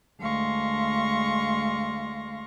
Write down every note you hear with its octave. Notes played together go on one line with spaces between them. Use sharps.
D2 G#3 F5 C6 C#6 A#6